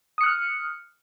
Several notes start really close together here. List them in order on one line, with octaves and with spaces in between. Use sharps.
D#6 C#7 F#6 F6